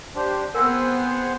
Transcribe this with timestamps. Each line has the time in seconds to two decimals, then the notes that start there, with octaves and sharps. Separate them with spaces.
0.16 D4 G4 C5
0.54 B3 C4 G#4 A#4 C5 F#5 E6